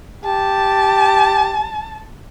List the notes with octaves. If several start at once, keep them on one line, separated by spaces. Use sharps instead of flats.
G4 A5